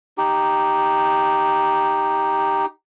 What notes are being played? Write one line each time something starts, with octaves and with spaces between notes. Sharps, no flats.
D#4 G4